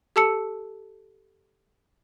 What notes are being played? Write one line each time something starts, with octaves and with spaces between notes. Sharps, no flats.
G4 A4 A5 E6 C#7